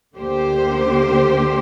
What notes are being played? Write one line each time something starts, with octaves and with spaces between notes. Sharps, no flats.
D2 D3 A#3 G4 C5